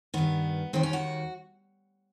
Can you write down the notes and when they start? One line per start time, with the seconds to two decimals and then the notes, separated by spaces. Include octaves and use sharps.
0.14 G2 D#3 B3
0.73 D#2 D#3 C4
0.83 C#4
0.93 F#4